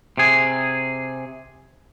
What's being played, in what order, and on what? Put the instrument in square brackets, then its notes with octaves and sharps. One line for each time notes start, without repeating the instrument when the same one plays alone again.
[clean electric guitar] C3 G#4